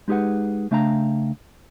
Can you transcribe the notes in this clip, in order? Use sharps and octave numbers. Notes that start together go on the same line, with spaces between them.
G#3 D#4 G4 G#4 B4 F#5
C#3 A3 D4 F5 G5 A#5